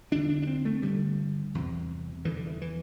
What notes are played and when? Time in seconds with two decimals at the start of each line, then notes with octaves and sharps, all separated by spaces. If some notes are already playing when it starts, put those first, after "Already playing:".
0.12 E2 D3 D4
0.29 D4
0.42 D4
0.47 C4
0.65 A3
0.82 G2 D3 G3
1.55 E2 C3
2.25 E2 D3 E3
2.36 D3
2.47 E3
2.62 E3